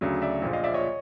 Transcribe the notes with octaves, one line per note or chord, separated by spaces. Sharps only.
D2 C#3 F#3
D5 E5
A#1 A#2 F3
D#5 F5
D5 E5
C#5 D#5